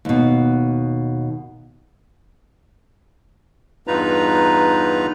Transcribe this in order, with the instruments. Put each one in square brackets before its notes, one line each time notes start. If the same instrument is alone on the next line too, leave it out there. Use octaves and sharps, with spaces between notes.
[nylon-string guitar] D#2 B2
[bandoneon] E2 G2 D#4 F4 B4 A#5